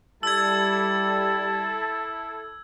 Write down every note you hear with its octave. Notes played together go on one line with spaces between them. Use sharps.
G3 E4 A4 A5 E6 G#6